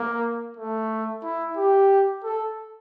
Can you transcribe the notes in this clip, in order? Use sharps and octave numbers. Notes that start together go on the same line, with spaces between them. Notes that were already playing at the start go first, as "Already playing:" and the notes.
Already playing: A#3
A3
E4
G4
A4